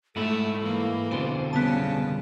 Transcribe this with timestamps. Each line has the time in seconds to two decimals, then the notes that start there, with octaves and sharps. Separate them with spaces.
0.16 G#2 A3 E4 A4
0.63 E3 A#3
1.11 F2 B2 D3 C5
1.53 C#3 G3 B3 A5